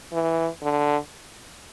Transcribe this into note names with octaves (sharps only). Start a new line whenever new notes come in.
E3
D3